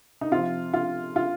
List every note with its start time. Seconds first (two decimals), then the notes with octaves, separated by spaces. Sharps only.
0.21 D#4
0.31 C3 F3 F4
0.74 F4
1.16 F4